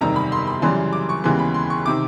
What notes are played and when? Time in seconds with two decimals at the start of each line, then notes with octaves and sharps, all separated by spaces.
0.01 F#1 E2 C3 D#3 G3 A#5
0.16 B5
0.32 C6
0.47 B5
0.62 F#2 C#3 E3 G3 C6
0.93 D6
1.09 C#6
1.24 D#2 C#3 E3 G#3 B3 C6
1.39 B5
1.54 C6
1.70 C#6
1.86 C3 D#3 D6